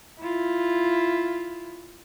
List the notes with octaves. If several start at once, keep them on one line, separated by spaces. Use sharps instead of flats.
E4 F4